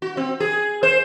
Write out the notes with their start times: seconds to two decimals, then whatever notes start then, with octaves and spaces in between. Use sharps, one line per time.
0.02 F#4
0.17 C4
0.40 G#4
0.83 C5